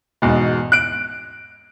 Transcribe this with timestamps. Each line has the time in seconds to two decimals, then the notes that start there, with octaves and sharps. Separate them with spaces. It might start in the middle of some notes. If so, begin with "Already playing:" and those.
0.22 E2 G#2 B2
0.72 F#6 D7